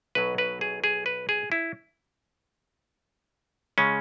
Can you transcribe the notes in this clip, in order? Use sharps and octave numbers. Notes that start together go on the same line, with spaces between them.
B1 B2 F#3 B4
B4
G#4
G#4
B4
G#4
E4
C#3 G#3 C#4